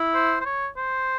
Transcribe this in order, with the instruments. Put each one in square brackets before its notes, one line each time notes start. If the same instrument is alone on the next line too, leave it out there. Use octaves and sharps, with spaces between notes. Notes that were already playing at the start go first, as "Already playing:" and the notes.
Already playing: [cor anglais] E4
[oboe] C5
C5
C#5
C5